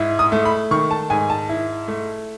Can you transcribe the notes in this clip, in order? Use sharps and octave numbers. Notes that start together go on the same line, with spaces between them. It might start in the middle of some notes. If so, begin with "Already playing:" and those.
Already playing: G#2 E4
D#6
A3
B5
D#3 C#6
A5
G#2 G#5
A5
E4
A3